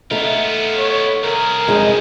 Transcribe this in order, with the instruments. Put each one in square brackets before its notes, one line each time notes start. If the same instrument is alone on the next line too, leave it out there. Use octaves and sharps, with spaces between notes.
[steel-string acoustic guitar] A3 D#4 [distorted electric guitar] B3 F4
[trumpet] C#5
[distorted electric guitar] C2 G#4 [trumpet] A#4
[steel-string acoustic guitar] F2 G#3 D#4